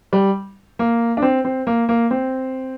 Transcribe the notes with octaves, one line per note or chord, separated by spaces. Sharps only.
G3
A#3
D4
C4
C4
A#3
A#3
C4